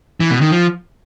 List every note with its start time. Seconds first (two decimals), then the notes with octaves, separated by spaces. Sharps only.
0.20 E3
0.31 B2
0.41 D#3
0.51 F3